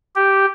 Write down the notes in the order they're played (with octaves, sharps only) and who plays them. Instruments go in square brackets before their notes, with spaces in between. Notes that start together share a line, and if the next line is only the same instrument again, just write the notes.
[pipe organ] G4